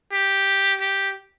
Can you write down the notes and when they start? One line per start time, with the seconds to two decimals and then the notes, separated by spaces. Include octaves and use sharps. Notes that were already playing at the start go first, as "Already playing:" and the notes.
0.13 G4
0.81 G4